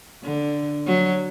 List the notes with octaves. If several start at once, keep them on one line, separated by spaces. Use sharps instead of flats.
D3
F#3